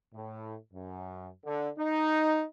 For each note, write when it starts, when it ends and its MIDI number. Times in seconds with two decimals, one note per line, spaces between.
0.14 0.55 45
0.73 1.29 42
1.45 1.68 50
1.78 2.42 63